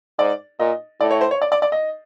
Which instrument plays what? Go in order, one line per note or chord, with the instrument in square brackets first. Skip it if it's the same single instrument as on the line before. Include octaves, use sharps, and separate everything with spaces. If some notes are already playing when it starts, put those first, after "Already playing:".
[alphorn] G#2 [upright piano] D5
[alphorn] A#2 [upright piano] D#5
[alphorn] A2 [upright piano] D5
[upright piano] C#5
C5
C#5
D5
D5
D5
D#5